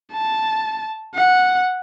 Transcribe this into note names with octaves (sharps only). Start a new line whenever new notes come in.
A5
F#5